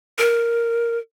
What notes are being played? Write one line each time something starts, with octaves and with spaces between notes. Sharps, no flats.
A#4